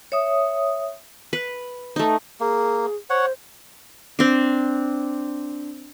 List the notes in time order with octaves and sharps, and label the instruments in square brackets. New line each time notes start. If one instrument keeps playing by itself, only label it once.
[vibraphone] C#5 E5 D#6
[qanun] B4
A3 D#4
[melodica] A#3 [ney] G#4
[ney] C5 [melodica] C#5 F#5
[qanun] C4 D4